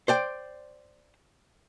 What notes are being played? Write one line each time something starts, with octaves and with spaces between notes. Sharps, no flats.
C5 D5 G5